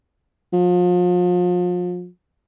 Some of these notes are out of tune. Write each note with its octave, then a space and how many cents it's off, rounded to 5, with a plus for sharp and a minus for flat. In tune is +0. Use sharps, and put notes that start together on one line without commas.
F3 +35